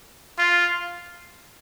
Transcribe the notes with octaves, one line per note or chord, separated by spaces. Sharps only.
F4